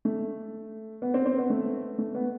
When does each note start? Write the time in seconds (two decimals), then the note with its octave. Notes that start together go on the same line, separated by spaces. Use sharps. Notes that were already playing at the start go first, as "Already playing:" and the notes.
0.05 A3
1.02 B3
1.14 C4
1.26 C4
1.37 B3
1.50 A3
1.98 A3
2.15 B3